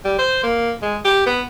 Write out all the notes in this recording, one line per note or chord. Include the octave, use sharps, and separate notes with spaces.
G3
C5
A#3
G#3
G4
B3